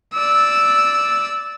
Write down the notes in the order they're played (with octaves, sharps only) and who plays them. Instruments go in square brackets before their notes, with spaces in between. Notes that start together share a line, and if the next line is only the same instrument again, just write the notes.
[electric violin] D5 E6